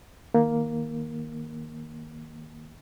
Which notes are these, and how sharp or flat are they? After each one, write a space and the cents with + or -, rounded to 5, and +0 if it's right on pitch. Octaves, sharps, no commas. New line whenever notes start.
D#3 +0 A#3 +0